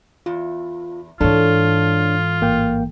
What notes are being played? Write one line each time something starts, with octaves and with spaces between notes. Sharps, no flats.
E2 F4
G#2 E3 D4 F4 A4 C#5
A1 A#3 G5